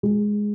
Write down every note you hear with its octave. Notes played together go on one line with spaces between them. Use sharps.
G#3